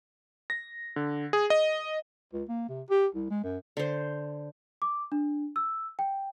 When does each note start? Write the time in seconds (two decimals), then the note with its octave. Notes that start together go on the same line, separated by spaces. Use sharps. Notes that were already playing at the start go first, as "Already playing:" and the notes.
0.50 A#6
0.96 D3
1.33 G#4
1.50 D#5
2.33 C#2
2.49 A#3
2.69 C3
2.90 G4
3.14 C2
3.30 G#3
3.44 F#2
3.77 D3 C5
4.82 D6
5.12 D4
5.56 E6
5.99 G5